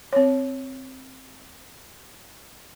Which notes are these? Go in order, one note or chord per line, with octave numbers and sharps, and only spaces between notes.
C4 C#5